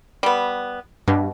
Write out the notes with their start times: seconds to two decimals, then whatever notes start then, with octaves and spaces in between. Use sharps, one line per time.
0.23 G3 B3
1.08 G2 B2